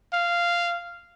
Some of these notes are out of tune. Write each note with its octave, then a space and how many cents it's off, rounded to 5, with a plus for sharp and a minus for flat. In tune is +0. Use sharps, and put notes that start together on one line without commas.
F5 -10